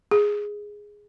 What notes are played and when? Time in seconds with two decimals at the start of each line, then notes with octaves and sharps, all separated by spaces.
0.11 G#4